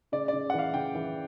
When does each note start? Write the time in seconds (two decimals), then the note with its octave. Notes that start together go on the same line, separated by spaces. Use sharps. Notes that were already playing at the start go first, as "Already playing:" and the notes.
0.12 C#3 D5
0.28 C#3 D5
0.50 F#5
0.54 E3 F5
0.74 C#3 G5
0.95 E3